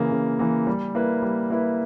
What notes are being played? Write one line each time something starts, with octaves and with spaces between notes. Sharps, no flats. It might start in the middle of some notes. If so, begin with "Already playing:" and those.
Already playing: C#3 E3 A#3
C#3
E3 A#3
G3
A#3 E4 B4
G3
A#3 E4 B4